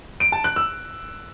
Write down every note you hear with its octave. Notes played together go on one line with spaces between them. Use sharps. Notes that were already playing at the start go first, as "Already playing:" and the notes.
D7
A5
F#6
E6